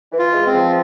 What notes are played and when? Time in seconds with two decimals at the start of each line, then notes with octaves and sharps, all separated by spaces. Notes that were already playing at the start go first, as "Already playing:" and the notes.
0.12 E3
0.19 F4
0.33 G#3
0.47 C4
0.54 F3